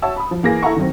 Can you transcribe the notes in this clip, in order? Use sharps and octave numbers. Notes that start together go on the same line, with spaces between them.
F#4 C#5 E5 A5 E6
B5 D#6
F3
E3 A#3 G#4 A#6
E4 A4 F5 F#5 A#5 C#6
D#3 F#3 C4